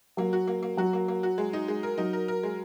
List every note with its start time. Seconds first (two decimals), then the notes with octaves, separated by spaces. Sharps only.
0.17 F#3 A#3
0.33 F#4
0.47 A#3
0.63 A#3
0.77 F#3 F#4
0.93 A#3
1.08 A#3
1.23 F#4
1.38 G#3
1.53 D#4
1.68 G#3
1.83 A#4
1.98 F#3 D#4
2.13 A#4
2.28 A#4
2.43 G#3